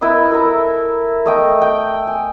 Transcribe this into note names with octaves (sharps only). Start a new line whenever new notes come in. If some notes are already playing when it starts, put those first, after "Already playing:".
E4 A#4 B4 D#5
A4 A#4 E5 A#5
A3 D#5 G5
G5
G#5